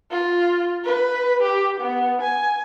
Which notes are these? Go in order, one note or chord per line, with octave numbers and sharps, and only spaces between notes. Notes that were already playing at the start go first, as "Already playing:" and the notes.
F4
B4
G4
B3
G#5